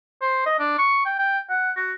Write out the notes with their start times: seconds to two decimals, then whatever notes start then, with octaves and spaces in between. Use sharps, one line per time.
0.22 C5
0.46 D#5
0.59 D4
0.78 C#6
1.06 G5
1.19 G5
1.50 F#5
1.77 F#4